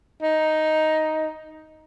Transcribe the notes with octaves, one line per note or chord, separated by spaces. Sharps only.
D#4